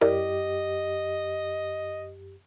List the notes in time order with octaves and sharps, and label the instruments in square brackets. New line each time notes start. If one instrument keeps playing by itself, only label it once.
[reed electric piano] F#2 G4 [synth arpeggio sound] E4 A#4 D5 [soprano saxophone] D#5